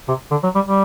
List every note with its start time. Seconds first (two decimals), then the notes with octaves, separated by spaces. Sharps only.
0.08 C3
0.31 D3
0.43 F#3
0.55 G3
0.66 G3